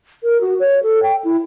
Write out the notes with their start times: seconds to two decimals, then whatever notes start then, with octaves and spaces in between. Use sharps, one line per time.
0.23 A#4
0.41 F#4
0.60 C#5
0.83 A4
1.03 G5
1.24 E4